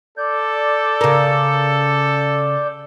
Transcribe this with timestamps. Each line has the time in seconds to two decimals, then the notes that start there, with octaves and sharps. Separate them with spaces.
0.18 A4 D5 G6
1.01 C#3 A#4